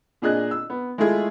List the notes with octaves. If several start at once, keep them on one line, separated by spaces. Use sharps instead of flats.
A#2 D4 G#4 D#5 F#6
E6
B3
G#3 A3 E4 F4 G#4